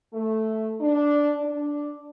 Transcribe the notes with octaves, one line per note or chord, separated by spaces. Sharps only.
A3
D4
D4